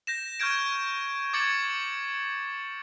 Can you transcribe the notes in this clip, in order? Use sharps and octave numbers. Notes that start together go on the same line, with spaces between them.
G6 A#6 E7
C#6 F6 G6 G#6 D7
D6 G#6 A6 C#7 F#7